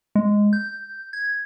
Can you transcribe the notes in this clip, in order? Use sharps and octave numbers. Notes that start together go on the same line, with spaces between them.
G#3
G6
G#6